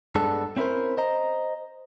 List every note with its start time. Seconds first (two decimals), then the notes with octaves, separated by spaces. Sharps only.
0.15 G2 G#3 B3 D4 A4
0.57 C4 C#4 E4 G#4 A#4 C5
0.97 C5 D#5 A#5